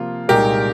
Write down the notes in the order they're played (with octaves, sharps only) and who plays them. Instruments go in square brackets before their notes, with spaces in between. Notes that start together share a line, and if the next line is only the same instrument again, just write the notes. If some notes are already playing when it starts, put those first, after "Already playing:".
Already playing: [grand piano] C3 F3 A#3 [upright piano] F4
[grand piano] C2 A#2 G#3 D#4 [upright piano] G4 A#4